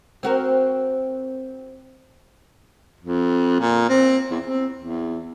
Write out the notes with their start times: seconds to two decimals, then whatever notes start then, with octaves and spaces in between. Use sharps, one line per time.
0.23 C4 F#4 A#4
3.00 F2
3.60 A#2
3.89 C4
4.31 E2
4.44 C4
4.78 E2